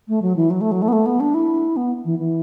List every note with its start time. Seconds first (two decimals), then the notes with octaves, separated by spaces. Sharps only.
0.08 A3
0.22 F#3
0.36 E3
0.50 F#3
0.61 A3
0.71 F#3
0.82 A3
0.88 B3
0.93 A3
1.06 B3
1.20 D4
1.34 E4
1.77 B3
2.05 E3
2.19 E3